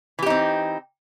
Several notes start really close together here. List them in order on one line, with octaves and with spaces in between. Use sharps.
E3 G4 D#4 C4